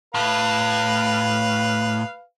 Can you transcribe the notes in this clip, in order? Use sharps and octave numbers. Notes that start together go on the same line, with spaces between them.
A2 B4 F5